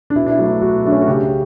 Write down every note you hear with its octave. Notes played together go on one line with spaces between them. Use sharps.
D4
B2 E4
D4
E4
F#3 A3
E4
B2 F#4
F#3 A3 D4
C#4
F#4
C#3 G4